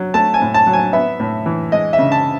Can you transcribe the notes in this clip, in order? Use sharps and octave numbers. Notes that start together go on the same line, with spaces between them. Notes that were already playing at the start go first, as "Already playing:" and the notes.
Already playing: F#3
A3 A5
G#5
A2
A5
F#3
G#5
B3 E5
A2
E3
G#3 D#5
E5
C#3
A5